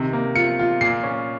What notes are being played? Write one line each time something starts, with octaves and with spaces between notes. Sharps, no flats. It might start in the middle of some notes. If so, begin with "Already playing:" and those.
Already playing: C3 D#3
A#3
F4 C#7
F4
A#2 C7
C#4